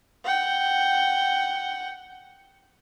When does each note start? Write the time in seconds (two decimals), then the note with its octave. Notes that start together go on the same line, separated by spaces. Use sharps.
0.24 F#5 G5